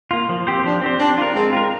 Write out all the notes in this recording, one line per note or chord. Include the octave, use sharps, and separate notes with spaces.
A#3 F4
F3
C4 G4 C5
F3 D4
C4 G4 C5
C4 D4
F4 A#4
G#3 C4
F4 A#4